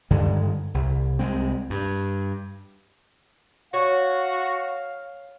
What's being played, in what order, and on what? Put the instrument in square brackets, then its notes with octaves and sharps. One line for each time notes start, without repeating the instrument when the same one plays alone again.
[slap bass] G2 D3 D#3 G#3
C2
C2 G#3 C4
G2
[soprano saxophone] F#4 [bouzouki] C#5 [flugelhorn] F5